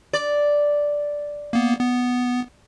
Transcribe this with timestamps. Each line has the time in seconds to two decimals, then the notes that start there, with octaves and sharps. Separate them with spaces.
0.13 D5
1.53 A#3 B3
1.80 B3